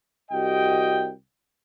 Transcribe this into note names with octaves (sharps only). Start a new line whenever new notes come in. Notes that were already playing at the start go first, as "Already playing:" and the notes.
C2 F#4 G4 D#5 G5